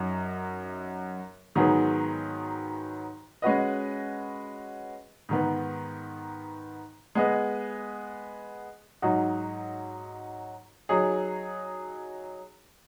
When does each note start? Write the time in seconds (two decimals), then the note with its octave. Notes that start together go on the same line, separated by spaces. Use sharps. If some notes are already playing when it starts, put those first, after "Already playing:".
Already playing: F#2 F#3 D#4 F#4
1.55 G#2 D#3 F#3 B3 G#4
3.42 G#3 C#4 F#4 B4 D#5
5.29 G#2 D#3 B3
7.15 G#3 B3 G#4 D#5
9.02 G#2 F#3 D#4 F#4
10.89 F#3 D#4 G#4 C#5